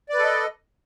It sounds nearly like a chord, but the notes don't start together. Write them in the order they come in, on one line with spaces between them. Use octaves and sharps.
D5 B4 A4 D#5